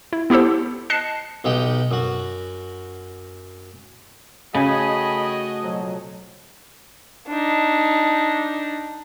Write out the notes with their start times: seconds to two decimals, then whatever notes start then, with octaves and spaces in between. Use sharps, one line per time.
0.13 E4
0.30 B3 E4 G4 A4 C5
0.90 D#5 A5 F#6 C7 C#7
1.44 B1 D#4 G4 F#5
1.91 F#2 F#4
4.54 C#3 A3 F#4 A4 D#5 G5 G#5 B5
5.63 F2 B2 F#3
7.28 D4 D#4